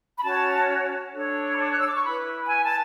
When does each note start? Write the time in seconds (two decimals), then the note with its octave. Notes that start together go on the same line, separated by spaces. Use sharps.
0.17 B5
0.23 C#4 F#4 C#5 A5
1.13 D4 A4 C#5
1.53 B5
1.58 A5
1.72 F#6
1.79 E6
1.87 D6
1.96 C#6
2.03 E4 B4 B5
2.49 G#5
2.62 A5